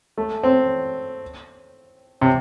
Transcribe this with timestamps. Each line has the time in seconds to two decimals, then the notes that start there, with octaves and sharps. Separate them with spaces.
0.17 A3
0.43 C4
2.21 C3